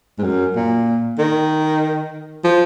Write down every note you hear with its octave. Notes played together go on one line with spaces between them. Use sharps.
G#2
F#2
A#2
D#3
F3